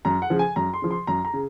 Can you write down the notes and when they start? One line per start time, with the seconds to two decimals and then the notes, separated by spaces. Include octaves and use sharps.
0.05 F#2 A#5
0.22 F#5
0.30 C#3 F3
0.39 G#5
0.56 F#2 A#5
0.74 C6
0.82 C#3 F3
0.91 C6
1.07 F#2 A#5
1.25 A#5
1.34 C#3